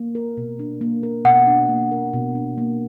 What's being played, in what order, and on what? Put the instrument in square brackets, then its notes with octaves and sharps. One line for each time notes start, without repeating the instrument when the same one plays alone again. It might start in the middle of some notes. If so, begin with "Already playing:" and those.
Already playing: [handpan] A#3
A#4
B2
D4
A#3
A#4
[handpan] B2 [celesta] F#5
[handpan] D4
A#3
A#4
B2
D4
A#3